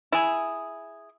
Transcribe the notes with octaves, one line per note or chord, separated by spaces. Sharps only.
E4 G#4